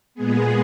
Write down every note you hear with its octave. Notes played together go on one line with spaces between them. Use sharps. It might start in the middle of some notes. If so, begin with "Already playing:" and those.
A#2 G#3 B3 G#4